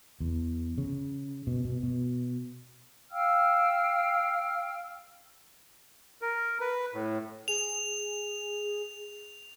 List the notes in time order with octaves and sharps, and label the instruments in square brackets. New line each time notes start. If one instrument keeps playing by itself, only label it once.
[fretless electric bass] E2
C#3
B2
B2
B2
[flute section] F5 G5 E6 F6
[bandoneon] A#4
B4
A2
[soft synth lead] G#4 [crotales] F7